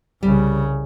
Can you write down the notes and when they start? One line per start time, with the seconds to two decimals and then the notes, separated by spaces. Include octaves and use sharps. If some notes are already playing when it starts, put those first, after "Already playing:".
0.23 C2 C#3 G3